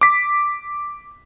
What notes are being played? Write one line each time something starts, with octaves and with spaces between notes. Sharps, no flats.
D6 B6